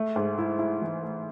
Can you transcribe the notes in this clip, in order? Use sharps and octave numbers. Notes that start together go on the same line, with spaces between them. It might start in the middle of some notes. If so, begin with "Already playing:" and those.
Already playing: A3
G#2
E4
E4
E3
A3